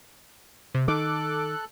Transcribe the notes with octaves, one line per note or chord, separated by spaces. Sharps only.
C3
D#3 A4 D6 F#6